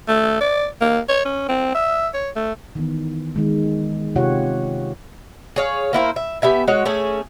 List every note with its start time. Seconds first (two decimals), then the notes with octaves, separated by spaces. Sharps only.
0.08 A3
0.41 D5
0.81 A#3
1.09 C#5
1.25 C#4
1.48 C4
1.75 E5
2.14 C#5
2.36 A3
2.75 D#3 E3 B3
3.36 D#3 G#3
4.16 C3 F4 G4 C#5 F#5
5.56 G#4 C#5 F5
5.93 A#3 E4 F#4 C5
6.16 E5
6.42 B3 G4 E5 G#5
6.68 G#3 F#4 C#5
6.85 A3 C#4 G#4 A4